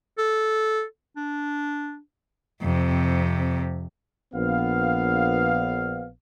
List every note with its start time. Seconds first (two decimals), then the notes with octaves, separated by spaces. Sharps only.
0.18 A4
1.16 D4
2.62 F2 C3
4.34 A#1 B3 F5